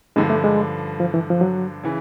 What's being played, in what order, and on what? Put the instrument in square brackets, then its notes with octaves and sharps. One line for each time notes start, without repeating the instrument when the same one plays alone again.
[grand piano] G2 D3 F3 [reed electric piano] G#3
[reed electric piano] A3
G#3
F3
E3
F3
F#3
[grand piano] C#3 E3